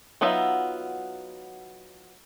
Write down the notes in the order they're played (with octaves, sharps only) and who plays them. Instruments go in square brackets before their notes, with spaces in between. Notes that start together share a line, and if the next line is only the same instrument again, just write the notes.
[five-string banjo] F#3 B3 D#4 F4 E5